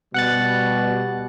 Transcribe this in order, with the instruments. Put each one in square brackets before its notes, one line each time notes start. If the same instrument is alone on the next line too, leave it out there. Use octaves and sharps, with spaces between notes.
[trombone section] B2 G3 [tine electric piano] F#5 F#6 A6